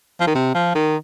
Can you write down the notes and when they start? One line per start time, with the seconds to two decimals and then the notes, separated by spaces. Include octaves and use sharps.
0.20 F3
0.27 D#3
0.35 C3
0.55 F3
0.75 D#3